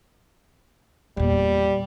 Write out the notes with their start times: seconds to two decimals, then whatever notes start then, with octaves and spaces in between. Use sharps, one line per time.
1.17 E2 A#2 G3